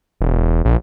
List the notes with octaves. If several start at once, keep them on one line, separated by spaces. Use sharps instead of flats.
E1
A#1